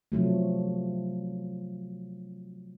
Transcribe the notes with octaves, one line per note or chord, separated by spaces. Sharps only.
C3 F3 F#3 A3